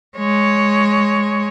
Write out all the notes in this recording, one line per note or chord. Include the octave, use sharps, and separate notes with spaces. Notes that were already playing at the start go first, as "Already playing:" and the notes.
G#3 C#5